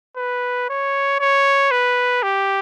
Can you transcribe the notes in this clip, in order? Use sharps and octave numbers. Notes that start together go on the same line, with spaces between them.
B4
C#5
C#5
B4
G4